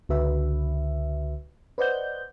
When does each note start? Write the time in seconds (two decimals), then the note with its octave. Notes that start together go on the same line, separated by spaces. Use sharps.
0.09 C#2 D3 F#4 B4 E5
1.78 B4 C5 D5 D#5 F#5 G6